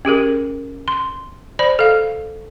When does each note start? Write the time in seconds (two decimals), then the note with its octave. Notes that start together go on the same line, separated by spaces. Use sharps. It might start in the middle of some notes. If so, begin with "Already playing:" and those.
0.05 C#4 G4 G#4 A#4
0.88 C6
1.59 C5 D5 B5
1.79 A4 F5